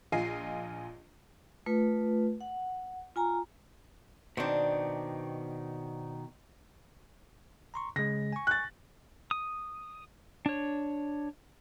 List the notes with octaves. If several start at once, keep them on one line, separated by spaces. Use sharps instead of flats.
A#1 F4 D#5 G#5 C7
A3 F4 B4
F#5
F4 G#5 A#5
B2 D#3 C4 D4
A#5 C6 C#6
C#3 G#3 A#6
G#5 C#6
F#6 A6
D#6
D4 C#5